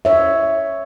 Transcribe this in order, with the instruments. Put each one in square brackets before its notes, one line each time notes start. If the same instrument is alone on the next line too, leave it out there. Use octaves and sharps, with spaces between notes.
[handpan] C#5 E5